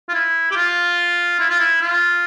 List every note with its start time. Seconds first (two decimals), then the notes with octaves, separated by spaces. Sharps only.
0.09 F4
0.14 E4
0.51 G4
0.56 F4
1.39 E4
1.50 F4
1.59 E4
1.81 F4